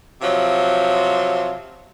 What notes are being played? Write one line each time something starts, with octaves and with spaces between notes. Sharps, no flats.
C3 F3 F#3